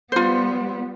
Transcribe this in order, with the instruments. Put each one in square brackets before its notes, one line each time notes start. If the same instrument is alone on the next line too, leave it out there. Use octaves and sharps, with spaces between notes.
[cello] G3 B3 [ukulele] F4 C5